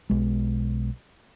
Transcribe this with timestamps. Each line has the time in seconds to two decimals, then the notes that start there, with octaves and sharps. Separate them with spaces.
0.10 B1 G#3